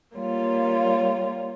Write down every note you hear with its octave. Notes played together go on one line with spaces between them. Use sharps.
G3 A#3 F4 C#5